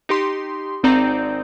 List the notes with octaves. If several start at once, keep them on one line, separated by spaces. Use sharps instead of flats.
D#4 G4 C6
G#1 C4 D#4 D5 A#5 G6